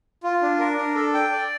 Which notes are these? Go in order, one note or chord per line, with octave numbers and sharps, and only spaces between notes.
F4
D4
A#4
D4
A4
G5
D5